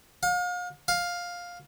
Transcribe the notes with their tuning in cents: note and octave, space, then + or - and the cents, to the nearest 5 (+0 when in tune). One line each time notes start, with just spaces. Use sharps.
F5 +40
F5 +10